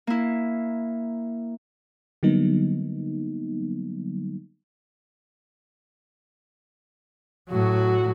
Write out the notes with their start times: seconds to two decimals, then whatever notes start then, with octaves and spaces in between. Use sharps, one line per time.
0.07 A#3 E4
2.23 D3 F#3 G3 A#3 B3 D#4
7.50 A2 F#3 F#4